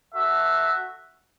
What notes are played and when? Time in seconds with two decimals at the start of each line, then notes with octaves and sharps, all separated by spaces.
0.14 F#4 A4 E5